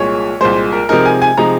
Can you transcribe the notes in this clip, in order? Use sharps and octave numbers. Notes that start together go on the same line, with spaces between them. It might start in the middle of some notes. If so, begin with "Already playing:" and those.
Already playing: C2 A#2 G#3 C#5
C2 A#2 G#3 C5
A#4
C3 F3 G#3 D#4 A#4
G#5
G#5
C3 F3 G#3 D#4 A#5